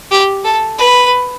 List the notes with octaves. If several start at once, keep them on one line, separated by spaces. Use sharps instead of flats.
G4
A4
B4